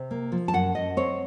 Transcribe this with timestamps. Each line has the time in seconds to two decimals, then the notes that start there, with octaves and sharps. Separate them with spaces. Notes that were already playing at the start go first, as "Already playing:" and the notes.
Already playing: C3
0.11 A#3
0.32 F3
0.48 A5
0.53 F#2 F#5
0.75 F#2 D#5
0.97 C4 C#5